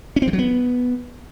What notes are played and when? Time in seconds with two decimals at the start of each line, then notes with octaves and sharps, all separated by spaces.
0.16 C#4
0.22 C4
0.27 F3
0.33 F#3
0.39 B3